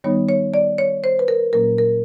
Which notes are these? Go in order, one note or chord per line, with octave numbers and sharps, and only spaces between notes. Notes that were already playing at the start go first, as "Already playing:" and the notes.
D#3 G3 B3 D#4 C#5
C#5
D5
C#5
C5
B4
A#4
A#2 F#3 A#3 C#4 A#4
A#4